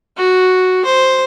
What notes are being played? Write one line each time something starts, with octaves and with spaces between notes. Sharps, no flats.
F#4
C5